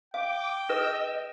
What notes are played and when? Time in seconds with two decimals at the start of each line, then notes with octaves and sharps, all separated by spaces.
0.14 F5 G5 D6
0.69 D#4 G#4 B4 D#5 E6